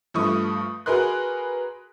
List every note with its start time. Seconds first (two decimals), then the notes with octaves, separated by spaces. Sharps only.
0.14 G2 F3 A3 C#6 D#6
0.86 F#4 G#4 A#4 B4 C6 F#6